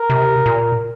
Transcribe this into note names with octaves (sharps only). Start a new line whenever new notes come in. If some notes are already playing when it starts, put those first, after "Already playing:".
Already playing: A#4
C3
A#2